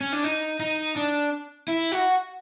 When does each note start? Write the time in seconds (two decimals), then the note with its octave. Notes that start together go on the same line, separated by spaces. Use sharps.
0.01 C#4
0.13 D4
0.24 D#4
0.60 D#4
0.96 D4
1.68 E4
1.92 F#4